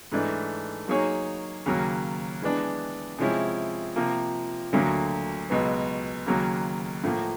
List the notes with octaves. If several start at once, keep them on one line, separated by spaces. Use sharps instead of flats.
G#2 E3 A3 D4
F#3 A#3 D#4 G#4 C#5
D#2 C#3 F#3 A#3
E3 G#3 B3 D4
C3 F3 G#3 C#4 E4
C3 F3 A#3
D2 D3 F#3 A#3
C#2 B2 F#3 B3
D#2 C#3 F#3 A#3
A2 F3 A#3